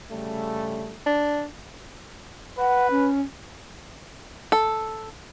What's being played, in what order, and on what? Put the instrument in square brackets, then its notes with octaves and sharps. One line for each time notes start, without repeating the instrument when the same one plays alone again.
[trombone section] C#3 G3 A3
[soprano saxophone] D4
[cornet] B4 [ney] F#5
[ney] C#4
[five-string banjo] A4